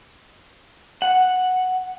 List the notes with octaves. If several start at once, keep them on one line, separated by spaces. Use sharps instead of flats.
F#5